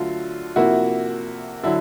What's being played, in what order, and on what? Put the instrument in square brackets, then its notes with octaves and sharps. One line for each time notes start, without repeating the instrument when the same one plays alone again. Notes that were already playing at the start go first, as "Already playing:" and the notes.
Already playing: [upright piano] D3 F#3 A3 F4
C3 F3 A#3 E4 F#4
D3 F#3 E4